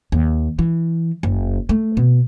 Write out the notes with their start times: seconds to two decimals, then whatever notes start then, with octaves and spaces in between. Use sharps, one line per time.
0.12 D#2
0.59 E3
1.23 F#1
1.69 A3
1.97 B2